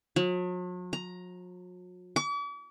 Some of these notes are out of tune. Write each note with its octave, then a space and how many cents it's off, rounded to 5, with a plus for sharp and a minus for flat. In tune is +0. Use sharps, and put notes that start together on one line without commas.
F#3 -45
A#5 +10
D6 -45